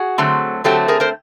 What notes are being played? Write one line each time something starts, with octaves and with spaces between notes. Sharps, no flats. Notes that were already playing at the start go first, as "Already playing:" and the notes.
Already playing: F#4 G#4
D3 F#3 A3 C4
D3 F#3 A3 C4 G4 A4
G#4 A#4
A#4 C5